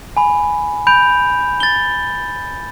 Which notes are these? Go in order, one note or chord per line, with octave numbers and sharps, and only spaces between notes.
G#5 B5
B5 G6 D7 F7
A6 G7